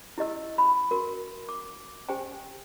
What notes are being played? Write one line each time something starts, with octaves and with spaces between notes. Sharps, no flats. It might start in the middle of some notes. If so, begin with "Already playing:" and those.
E4 G4 D#5 E6
B5
F#4 A#4
D6
G4 C5 G5 G#5